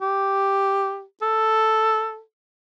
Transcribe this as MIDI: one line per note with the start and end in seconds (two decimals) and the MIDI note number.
0.01 1.03 67
1.22 2.21 69